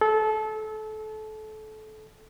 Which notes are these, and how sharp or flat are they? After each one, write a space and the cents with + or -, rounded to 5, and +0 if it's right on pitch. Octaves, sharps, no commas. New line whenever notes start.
A4 -25